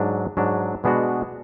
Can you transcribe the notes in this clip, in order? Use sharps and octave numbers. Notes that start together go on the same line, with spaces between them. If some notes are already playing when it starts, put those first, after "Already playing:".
Already playing: G#2 F#3 D4
G#2 F#3 D4
B2 G#3 B3 D4 F#4